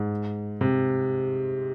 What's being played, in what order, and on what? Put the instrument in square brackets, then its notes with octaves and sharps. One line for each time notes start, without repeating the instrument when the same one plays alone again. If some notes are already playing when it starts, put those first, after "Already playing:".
Already playing: [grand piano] G#2
C3